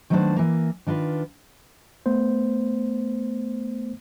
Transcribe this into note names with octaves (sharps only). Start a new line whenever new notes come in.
D#3 F#3 A3 B3 D4 C5
E3 A#3
D#3 D4 F4 B4
A3 B3 C5